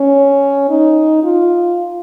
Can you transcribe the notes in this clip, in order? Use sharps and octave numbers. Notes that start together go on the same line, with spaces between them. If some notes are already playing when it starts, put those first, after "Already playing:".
Already playing: C#4
D#4
F4